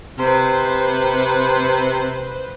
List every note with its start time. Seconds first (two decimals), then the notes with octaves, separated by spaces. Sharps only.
0.18 C3 B4 C5